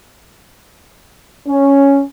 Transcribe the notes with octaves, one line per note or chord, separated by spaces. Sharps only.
C#4